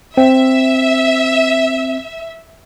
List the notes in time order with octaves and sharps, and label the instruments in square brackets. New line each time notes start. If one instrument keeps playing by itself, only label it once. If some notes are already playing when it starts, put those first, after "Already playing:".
[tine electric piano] C4 [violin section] E5